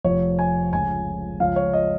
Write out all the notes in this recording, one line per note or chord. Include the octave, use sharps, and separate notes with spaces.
F1 F2 F3 C#5
G#5
C#2 C#3 F3 G#5
C#2 C#3 F3 F5
C#5
D#5